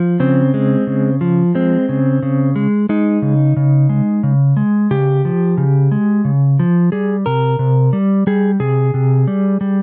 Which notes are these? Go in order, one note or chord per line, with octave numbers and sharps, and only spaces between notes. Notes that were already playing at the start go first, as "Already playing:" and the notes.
Already playing: F3
C#3 C4
G#3
C#3
F3
G#3 C4
C#3
C#3
G#3
G#3 D#4
C#3
C#3
G#3
C#3
G#3
C#3 G4
F3
C#3
G#3
C#3
F3
G3 G#4
C3 A#4
C3
G3
G3 G#4
C3 G#4
C3
G3
G3